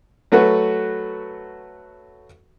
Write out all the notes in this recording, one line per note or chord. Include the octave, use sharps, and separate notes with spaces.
F#3 A3 F#4 B4